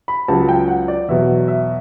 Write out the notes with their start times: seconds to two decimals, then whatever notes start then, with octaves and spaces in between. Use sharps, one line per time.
0.08 B5
0.28 C#2 C#3 F#3 A5
0.49 G5
0.68 F#5
0.88 D5
1.08 E2 B2 F#3 E5
1.48 E5